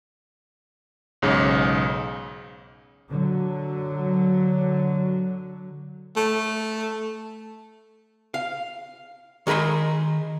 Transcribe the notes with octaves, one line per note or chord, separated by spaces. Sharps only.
B1 G#2 C#3
D3 F#3
A3
F5
D#3 G#4 A#4 B5 C6